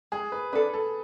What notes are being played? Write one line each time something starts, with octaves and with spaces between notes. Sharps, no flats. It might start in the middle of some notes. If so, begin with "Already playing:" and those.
G#3 G#4
B4
D4 A4 B4
A4